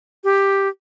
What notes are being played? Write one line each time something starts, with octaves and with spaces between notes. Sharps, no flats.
G4